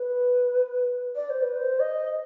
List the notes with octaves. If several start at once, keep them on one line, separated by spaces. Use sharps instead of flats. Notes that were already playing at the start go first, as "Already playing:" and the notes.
Already playing: B4
D5
C5
B4
C5
D#5